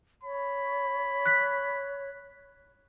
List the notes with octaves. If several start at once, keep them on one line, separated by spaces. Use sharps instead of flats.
C#5 B5
F#6 B6